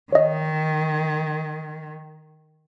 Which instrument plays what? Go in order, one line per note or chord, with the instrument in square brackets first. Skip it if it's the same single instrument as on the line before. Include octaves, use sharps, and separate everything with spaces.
[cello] D#3 [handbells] C#5 D#5